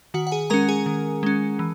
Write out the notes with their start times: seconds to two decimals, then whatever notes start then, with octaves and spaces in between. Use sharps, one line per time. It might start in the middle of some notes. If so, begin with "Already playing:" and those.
0.14 D#3 F#4 F#5
0.27 F#5
0.31 G#4 G#5
0.50 G#3 A#4 A#5
0.54 C#4
0.69 G#4 G#5
0.86 D#3
1.23 G#3 C#4
1.59 E3